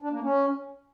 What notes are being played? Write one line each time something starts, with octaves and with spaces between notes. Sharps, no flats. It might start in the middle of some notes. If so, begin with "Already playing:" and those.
D4
A#3
C#4